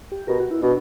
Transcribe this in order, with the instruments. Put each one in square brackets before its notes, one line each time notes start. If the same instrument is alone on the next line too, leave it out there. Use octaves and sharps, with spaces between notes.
[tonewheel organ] G4
[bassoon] B2 [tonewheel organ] A#4
[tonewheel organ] F#4
E4
[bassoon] B2 [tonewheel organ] D4